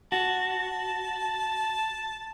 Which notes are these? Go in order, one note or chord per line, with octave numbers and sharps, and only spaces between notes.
F#4 A5